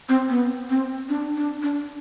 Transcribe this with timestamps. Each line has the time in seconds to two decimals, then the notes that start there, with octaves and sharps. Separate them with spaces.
0.09 C4
0.29 B3
0.70 C4
1.09 D4
1.37 D4
1.62 D4